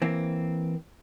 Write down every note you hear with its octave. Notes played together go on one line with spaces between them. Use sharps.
E3 A#3 C4